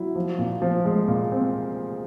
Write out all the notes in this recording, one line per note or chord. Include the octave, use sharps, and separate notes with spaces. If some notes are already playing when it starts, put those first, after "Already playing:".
Already playing: F#3 E4
F3
A#2
F3
G#3
A#2
C4